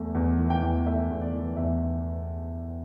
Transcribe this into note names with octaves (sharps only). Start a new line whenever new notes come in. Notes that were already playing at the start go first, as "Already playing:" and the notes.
Already playing: E2 A3
E2
E3
G5
E2
A3 E5
E2
D5
E3
E2 E5